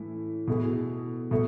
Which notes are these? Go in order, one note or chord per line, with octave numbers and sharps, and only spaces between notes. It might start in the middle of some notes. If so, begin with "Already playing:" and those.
Already playing: A2 E3 A3 C#4 E4
B2 A3 E4 G#4
B2 A3